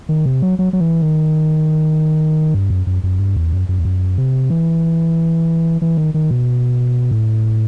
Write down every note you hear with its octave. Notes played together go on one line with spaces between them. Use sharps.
D#3
C3
F#3
F#3
F#3
E3
D#3
G2
F#2
F#2
F#2
G2
E2
F#2
F#2
E2
F#2
C3
E3
E3
D#3
D#3
B2
A2